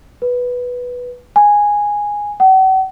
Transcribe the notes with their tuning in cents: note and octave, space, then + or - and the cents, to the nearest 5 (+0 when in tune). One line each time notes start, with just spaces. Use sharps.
B4 -5
G#5 -5
F#5 +45